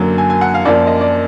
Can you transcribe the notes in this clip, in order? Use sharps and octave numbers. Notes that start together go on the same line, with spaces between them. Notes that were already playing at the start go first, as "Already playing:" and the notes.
Already playing: F#2 D3 F#3 A#3
G#5
G#5
F#5
F5
F#2 F3 A#3 F4 D5
D#5
D5